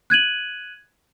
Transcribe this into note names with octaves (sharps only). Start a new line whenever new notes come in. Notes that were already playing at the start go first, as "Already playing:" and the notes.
F#6 G#6 D#7 F#7